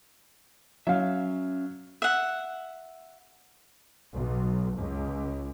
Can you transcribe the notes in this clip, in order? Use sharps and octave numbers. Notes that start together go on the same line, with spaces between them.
F#3 C#4 E5 F5
E5 F#5
B1
C#2